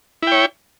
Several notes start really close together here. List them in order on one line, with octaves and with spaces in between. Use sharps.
E4 G5 C#5